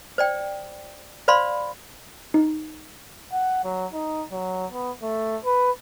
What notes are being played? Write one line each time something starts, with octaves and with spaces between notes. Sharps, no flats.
C5 D5 G5
C5 D5 F5 B5 C6
D#4
F#5
F#3
D#4
F#3
B3
A3
B4